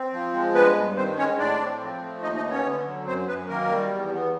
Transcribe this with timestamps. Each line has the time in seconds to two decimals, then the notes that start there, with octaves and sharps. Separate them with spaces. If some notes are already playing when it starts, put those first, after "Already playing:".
Already playing: C4
0.13 F3
0.33 G#3
0.54 G2 B3 B4
0.76 G2
0.97 D#3 C4 C5
1.18 G#3 C#4 C#5
1.38 A2 D4 D5
1.60 C4
1.81 F3
2.02 A3
2.22 D#2 D#4 D#5
2.37 D#4 D#5
2.44 B3
2.51 C#4 C#5
2.65 D3
2.86 F#3
3.06 F#2 C4 C5
3.28 F#2 B3 B4
3.48 D#3 A#3 A#4
3.69 G3
3.91 E2
4.12 B3